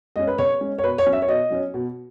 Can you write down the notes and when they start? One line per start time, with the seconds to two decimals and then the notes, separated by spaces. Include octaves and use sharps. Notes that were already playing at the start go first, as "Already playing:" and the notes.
0.16 G#3 C#4 D#5
0.27 B4
0.38 C#3 C#5
0.61 G#3 C#4
0.78 C#5
0.83 B2 B4
0.98 C#5
1.06 F#3 C#4
1.13 E5
1.22 C#5
1.29 B2 D#5
1.50 F#3 C#4
1.74 B2